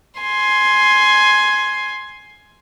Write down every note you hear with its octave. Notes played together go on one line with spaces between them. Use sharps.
G#5 C6